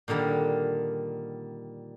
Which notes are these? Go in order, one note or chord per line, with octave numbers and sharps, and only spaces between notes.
A#2 D3 D#3 G3